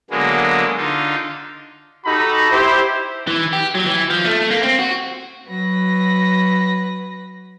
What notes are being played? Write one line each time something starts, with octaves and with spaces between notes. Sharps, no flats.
D3 F#3 G#3 A#3 B3
D3 D#4 F4
D#4 F#4 G4 A4 A#5 B5
E4 G4 C5
E3
G4
F#3
E3
F3
A3
A#3
C4
F#4
F#3 B4 A#6